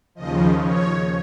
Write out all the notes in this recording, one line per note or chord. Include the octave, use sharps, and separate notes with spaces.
D#2 C#3 F3 D#5
C#5